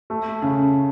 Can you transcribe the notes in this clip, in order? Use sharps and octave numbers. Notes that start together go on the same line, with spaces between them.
A3
C#3